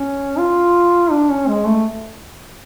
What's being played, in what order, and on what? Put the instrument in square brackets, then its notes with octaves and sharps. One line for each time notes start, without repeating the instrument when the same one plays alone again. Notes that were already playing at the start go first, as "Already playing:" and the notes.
Already playing: [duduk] C#4
F4
D4
C#4
G#3
A3